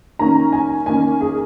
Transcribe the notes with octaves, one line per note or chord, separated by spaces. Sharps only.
D#3 A#3 C#4 A#5
G#5
D#3 A#3 C#4 G#5
G#4